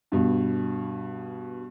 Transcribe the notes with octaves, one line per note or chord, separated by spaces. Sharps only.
G2 B2